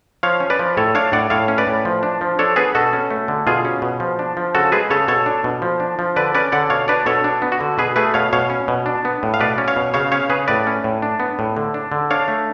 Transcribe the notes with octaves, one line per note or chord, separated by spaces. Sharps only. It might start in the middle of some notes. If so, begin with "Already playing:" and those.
F3 C#5 F5
C#4
B4 D5
F3
A2 A4 C#5
D4 C#5 F5
A2 D5 F#5
A2 C#5 F5
C#4
B4 D5
A2
F3
D4
F3
D4 A4 C#5
B3 G#4 B4
B2 F#4 A4
C#4
A3
D3
B2 F4 G#4
C#4
B2
F3
D4
F3
C#3 F#4 A4
G#3 G#4 B4
C#3 A4 C#5
B2 A4 C#5
D4
B2
F3
D4
F3
D3 B4 D5
C#4 B4 D5
D3 D5 F#5
B2 C#5 F5
D4 B4 D5
B2 A4 C#5
D4
B3
F#4
D3
B2 G#4 B4
A3 G#4 B4
B2 C#5 F5
B2 C#5 F5
C#4
B2
D4
B3
A2
F5
B2 B4 D5
C#4
C#5 F5
B2
C#3 C#5 F5
C#4 C#5 F5
C#3 G#4 B4
A2 B4 D5
C#4
A2
D4
B3
A2
D3
D4
D3
D4 C#5 F5
A3